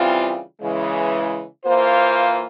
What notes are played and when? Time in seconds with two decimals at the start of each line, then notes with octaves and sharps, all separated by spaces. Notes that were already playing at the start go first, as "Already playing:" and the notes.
Already playing: C#3 E3 G3 C4 F4
0.61 C#3 E3 G#3
1.64 E3 A#3 F4 C5